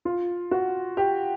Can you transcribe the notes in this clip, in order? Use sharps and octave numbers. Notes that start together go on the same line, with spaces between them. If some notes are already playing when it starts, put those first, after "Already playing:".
F4
F#4
G4